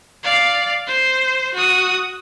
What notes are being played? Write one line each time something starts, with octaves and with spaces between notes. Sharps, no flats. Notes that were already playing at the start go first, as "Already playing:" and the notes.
D5 F5
C5
F#4 D#6